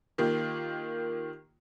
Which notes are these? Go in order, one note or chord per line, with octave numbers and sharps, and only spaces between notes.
D#3 A#3 F4 G4